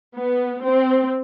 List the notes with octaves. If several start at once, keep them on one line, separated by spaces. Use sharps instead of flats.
B3
C4